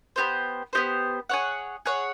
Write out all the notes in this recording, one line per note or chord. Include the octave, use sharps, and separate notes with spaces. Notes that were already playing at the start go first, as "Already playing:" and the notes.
B3 D#4 G4 C5
B3 D#4 G4 C5
G#4 C#5 F#5
G#4 C#5 F#5